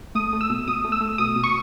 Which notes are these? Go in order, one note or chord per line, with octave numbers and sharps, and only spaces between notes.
A3 D#6
A3
E6
B2
B2 D#6
A3
E6
A3
B2 D#6
B2
C#6